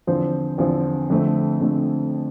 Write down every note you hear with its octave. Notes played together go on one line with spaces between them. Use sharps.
E2 D3 F3 C4 C5
E2 D3 F3 C4
F2 D3 A3 C4
F2 D3 A3 C4